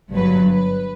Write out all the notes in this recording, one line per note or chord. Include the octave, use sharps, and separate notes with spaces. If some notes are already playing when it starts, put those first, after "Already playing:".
G1 G2 F#3 B4
B4